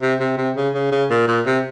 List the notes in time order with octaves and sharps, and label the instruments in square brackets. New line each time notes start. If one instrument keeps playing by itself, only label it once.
[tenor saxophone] C3
C3
C3
C#3
C#3
C#3
A#2
A#2
C3